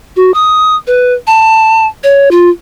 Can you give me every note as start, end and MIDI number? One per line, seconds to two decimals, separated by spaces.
0.16 0.32 66
0.34 0.76 87
0.87 1.13 71
1.27 1.86 81
2.04 2.31 73
2.31 2.49 65